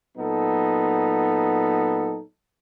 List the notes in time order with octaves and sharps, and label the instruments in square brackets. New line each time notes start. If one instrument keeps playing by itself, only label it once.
[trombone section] A#2 F#3 B3 D#4 A4